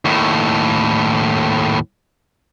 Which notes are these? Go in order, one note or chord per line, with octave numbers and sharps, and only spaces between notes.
D#2 A2